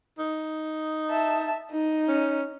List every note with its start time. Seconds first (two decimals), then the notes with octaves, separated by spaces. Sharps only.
0.19 D#4
1.11 E5 A5
1.71 D#4
2.08 C#4